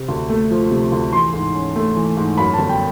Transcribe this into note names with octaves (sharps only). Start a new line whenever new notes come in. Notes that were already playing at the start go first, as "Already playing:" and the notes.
Already playing: C3
D2
A3
F3
C3
D2
E3 C6
G#2
C#4
A3
E3
G#2
F#2 B5
A5
G1
G5